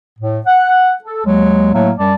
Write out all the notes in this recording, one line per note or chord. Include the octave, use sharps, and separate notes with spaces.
A2
F#5
A4
D#2 F#3 G#3
A2 F#3 A3 A#3
F#2 G3 D5 A5